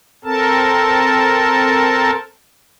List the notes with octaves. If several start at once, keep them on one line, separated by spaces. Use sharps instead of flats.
C4 A4 A#4 A5